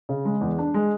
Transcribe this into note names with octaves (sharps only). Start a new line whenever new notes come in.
C#3
G#3
E2
D4
G#3